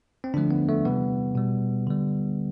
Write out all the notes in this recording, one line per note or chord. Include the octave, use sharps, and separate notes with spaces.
C4
D3 F3 A3 D4
B3
A3
C3 E3 G3 B3
B2 G3
D3 G3